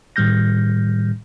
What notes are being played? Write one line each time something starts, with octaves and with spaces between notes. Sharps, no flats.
A2 D#3 G3 F6 G6 A#6